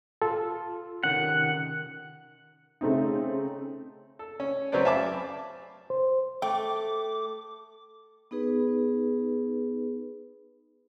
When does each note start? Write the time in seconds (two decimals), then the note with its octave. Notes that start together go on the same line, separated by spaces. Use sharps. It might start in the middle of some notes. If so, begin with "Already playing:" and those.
0.22 F4 A4
1.03 C3 D#3 C#4 F#5
2.81 C#3 A3 C4 D#4
4.19 A4
4.40 C#4
4.72 F#3 C4 C#4 B4 C5 D5
4.85 E5 F5 G#5 A5 B5 D6
5.90 C5
6.42 A3 G5 D6
8.31 B3 D#4 G#4 B4